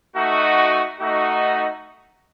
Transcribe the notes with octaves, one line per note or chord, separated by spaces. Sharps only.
A3 D#4 F#4
A3 D#4 F#4